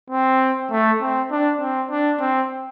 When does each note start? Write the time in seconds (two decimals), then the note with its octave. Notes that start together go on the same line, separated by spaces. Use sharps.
0.10 C4
0.71 A3
1.01 C4
1.31 D4
1.61 C4
1.91 D4
2.20 C4